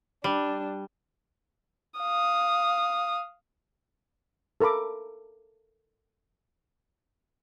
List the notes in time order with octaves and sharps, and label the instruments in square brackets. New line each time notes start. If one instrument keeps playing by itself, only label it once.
[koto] G3 [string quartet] D4
[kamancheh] F5 D#6
[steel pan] A4 A#4 A#5 B5 D6